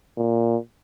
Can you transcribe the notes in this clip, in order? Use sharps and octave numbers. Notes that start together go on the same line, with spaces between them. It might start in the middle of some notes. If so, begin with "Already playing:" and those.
A#2